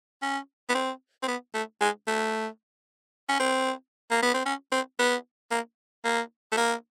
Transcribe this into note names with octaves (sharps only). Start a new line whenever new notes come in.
C#4
B3
C4
C4
B3
A3
G#3
A3
C#4
C4
A#3
B3
C4
C#4
C4
B3
A#3
A#3
A3
A#3